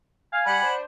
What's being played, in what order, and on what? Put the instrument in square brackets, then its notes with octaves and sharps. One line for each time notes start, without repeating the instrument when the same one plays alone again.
[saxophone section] F5 [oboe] G#5
[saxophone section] G3 [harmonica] F#5 B5
[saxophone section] D4 C5